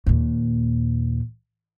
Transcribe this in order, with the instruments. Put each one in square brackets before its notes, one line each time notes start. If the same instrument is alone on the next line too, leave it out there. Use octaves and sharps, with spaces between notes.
[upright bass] D#2 A#2